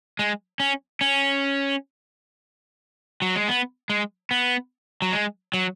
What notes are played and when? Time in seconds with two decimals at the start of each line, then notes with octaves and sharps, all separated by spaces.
0.19 G#3
0.60 C#4
1.01 C#4
3.22 F#3
3.35 G#3
3.48 B3
3.90 G#3
4.31 B3
5.02 F#3
5.12 G#3
5.54 F#3